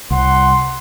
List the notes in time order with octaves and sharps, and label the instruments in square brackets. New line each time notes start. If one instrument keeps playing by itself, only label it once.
[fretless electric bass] C2 [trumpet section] F#5 C6